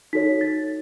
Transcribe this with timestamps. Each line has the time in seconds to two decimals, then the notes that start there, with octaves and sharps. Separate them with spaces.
0.13 D#4 F#4 A4 C#5 B6
0.41 A6